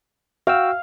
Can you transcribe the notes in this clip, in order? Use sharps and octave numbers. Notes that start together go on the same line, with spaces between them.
F#4 F5 G5 E6